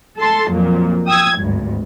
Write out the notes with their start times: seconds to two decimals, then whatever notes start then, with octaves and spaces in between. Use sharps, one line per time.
0.18 A4 A5 C6
0.49 F2 A#2 F#3
1.06 G5 D#6 E6 G#6
1.39 G#1 D2 G2